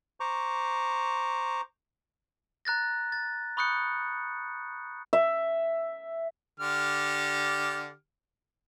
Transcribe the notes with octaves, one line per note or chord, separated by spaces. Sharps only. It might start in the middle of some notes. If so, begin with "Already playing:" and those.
C5 A#5 C#6 D6
A#5 F#6 A6 A#6
A6
B5 C#6 D#6 F#6 G6 C#7
E5
D3 G4 F6